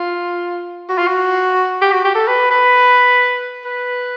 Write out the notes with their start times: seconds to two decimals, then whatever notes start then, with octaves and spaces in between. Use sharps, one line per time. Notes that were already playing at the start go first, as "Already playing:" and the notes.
Already playing: F4
0.89 F#4
0.98 F4
1.08 F#4
1.82 G4
1.92 F#4
2.04 G4
2.15 A4
2.27 B4
2.51 B4
3.65 B4